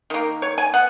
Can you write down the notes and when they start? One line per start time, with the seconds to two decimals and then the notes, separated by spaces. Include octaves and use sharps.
0.10 D#3 A#3
0.42 C#5
0.58 G#5
0.74 B3 F#5